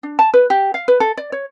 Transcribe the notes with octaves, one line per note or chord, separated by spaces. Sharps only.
D4
A5
B4
G4
F5
B4
A4
D5
C#5